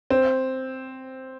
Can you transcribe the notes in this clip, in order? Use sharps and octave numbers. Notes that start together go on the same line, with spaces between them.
C4